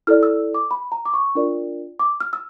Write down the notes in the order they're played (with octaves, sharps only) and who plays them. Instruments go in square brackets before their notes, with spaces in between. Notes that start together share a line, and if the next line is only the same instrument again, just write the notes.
[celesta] E4 A4 D5 F6
E6
D6
B5
A#5
D6
C#6
D4 F4 A#4 D5
D6
F6
E6